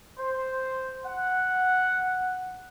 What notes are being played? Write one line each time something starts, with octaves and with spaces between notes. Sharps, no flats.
C5
F#5